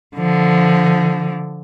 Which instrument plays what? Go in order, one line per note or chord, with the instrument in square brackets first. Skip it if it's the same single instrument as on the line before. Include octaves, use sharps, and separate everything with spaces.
[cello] D3 F3